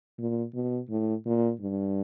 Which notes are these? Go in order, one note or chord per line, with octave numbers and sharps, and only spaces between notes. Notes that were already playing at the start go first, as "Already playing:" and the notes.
A#2
B2
A2
A#2
G2